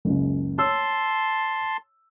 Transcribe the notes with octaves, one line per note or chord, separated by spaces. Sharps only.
F#1 C#2
C#5 A5 C6 E6